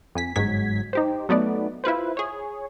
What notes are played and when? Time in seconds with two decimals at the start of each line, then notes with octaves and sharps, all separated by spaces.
0.15 F2 G#5 B6
0.36 G1 G#2 F#3 G#3 G#6 B6
0.93 D#4 G4 C5
1.29 F#3 A3 B3 D#4 D5
1.84 E4 F4 B4 C5
2.17 G#4 C#5